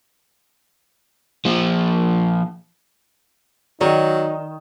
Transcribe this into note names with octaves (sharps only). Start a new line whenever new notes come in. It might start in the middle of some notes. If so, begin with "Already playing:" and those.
F3 A#3
D#3 F#3 D#4 D5